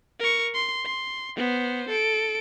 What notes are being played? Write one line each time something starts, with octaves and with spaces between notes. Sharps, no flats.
A#4 C#6
C6
C6
B3 C5
A4 D7